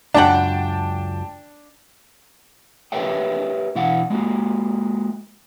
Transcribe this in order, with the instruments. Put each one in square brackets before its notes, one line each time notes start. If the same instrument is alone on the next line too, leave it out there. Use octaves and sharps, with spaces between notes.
[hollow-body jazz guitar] C#2 F#2 F#5 [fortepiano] D4 [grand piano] G5 A5
[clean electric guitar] G4 A#4 B4 C#5 E5 G5
B2 E3 E4 F5 F#5
G#3 A#3 F#4